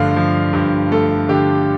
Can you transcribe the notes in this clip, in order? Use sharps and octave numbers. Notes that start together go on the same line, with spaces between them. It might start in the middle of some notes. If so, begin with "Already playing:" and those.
Already playing: G2 D3 F3 A3 F5
F3
G2
A3 A4
D3 G4